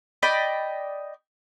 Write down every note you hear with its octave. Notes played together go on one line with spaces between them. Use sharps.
D5 D#5 G5 B5